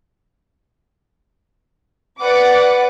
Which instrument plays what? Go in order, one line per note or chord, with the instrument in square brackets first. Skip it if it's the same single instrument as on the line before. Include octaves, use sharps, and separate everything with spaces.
[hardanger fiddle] B4 [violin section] D5 F#5 D6